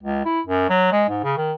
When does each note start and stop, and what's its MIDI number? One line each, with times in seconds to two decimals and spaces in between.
0.03 0.22 37
0.25 0.40 64
0.47 0.65 42
0.69 0.89 54
0.92 1.05 56
1.09 1.23 44
1.24 1.33 49
1.37 1.53 51